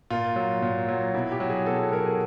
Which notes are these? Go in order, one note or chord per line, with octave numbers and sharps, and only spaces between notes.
A#2 F4
F#3
A#2
F#3
B2 E4
G4
F#3
G#4
B2 A4
A4
F#3 A#4
G#4